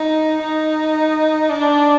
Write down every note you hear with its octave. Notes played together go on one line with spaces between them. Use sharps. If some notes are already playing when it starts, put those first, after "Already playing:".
Already playing: D#4
D#4
D4